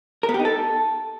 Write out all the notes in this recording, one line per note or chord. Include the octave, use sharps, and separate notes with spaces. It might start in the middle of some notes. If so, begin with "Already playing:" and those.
A#4
B3
G4
D#4
A4